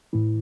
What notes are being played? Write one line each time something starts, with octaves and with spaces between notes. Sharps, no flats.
A2 E3